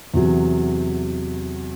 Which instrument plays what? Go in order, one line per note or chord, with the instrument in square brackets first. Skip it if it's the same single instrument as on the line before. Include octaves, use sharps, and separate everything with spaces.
[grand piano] E2 C3 F#3